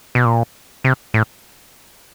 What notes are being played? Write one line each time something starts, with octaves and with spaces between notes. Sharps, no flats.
B2
A#2
C3
A2